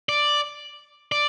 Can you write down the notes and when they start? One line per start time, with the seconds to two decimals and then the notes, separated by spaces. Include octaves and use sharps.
0.09 D5
1.12 D5